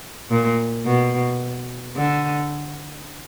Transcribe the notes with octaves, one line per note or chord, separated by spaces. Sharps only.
A#2
B2
D3